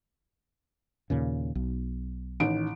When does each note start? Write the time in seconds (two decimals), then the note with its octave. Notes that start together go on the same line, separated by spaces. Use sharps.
1.10 D#2 A#2 C#3
1.55 B1
2.40 A1 D#3 D7